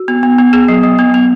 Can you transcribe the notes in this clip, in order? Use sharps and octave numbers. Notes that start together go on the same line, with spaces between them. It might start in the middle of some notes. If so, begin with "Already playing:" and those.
Already playing: F#4
B3
B3
B3
B3 G#4
F#3
F#3
B3
B3